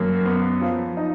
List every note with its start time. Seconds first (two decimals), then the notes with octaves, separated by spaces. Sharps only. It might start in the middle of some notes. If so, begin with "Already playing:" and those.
Already playing: F#2 A#3
0.26 B3
0.61 F3
0.97 D#4